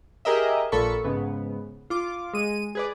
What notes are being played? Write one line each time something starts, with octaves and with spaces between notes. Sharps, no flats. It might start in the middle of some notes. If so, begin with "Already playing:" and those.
G4 G#4 A#4 D#5 E5
A#1 A#2 A4 B5 C#6
G#2 C#3 B3
F4 D6
G#3 D#7
G#4 B4 D5